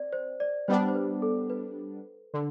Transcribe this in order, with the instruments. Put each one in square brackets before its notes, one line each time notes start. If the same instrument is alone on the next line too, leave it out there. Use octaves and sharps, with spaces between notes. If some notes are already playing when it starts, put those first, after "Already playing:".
Already playing: [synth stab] C4 [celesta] D5
[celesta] C5
D5
[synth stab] G3 B3 D4 [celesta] C5
[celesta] C5
B4
A4
B4
[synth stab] D3